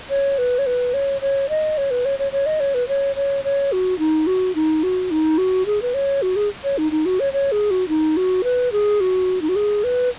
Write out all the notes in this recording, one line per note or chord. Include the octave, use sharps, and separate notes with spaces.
C#5
B4
C#5
B4
C#5
C#5
D#5
C#5
B4
C#5
C#5
C#5
D#5
C#5
B4
C#5
C#5
C#5
F#4
D#4
F#4
D#4
F#4
D#4
F#4
G#4
B4
C#5
F#4
G#4
C#5
D#4
D#4
F#4
C#5
C#5
G#4
F#4
D#4
F#4
B4
G#4
F#4
D#4
F#4
G#4
B4